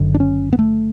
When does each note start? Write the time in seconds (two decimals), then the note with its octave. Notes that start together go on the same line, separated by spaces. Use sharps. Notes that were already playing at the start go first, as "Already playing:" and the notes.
Already playing: F#1 F#2 D3
0.14 D4
0.20 C#4
0.53 B3
0.59 A3